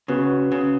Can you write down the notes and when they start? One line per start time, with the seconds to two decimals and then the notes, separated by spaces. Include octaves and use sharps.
0.08 C#3 B3 F#4 B4
0.52 C#3